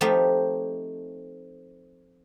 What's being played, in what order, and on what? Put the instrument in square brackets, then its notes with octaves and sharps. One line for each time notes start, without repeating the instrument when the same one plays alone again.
[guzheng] F3 A3 C4 D#4 G4